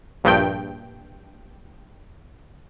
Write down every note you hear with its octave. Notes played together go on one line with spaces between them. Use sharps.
A#1 G2 G5